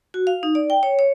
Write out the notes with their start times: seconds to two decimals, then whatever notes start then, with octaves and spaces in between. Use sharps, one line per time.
0.14 F#4
0.27 F5
0.43 D#4
0.55 D5
0.70 G5
0.83 C#5
0.99 C#5